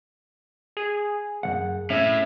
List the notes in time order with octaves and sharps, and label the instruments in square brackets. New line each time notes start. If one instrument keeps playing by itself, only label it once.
[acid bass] G#4
[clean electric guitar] F#2 F3 F#5
[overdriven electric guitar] A2 [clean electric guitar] C#4 [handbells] E5